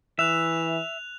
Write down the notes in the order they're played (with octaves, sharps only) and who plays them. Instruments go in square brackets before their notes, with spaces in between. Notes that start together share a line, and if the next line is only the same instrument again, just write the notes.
[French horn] E3 [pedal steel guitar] E5 [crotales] F#6 F7